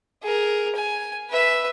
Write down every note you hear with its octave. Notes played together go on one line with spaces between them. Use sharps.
G#4 A#4
G#5
B4 E5